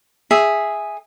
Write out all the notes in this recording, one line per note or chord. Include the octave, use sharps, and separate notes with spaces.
G#4 E5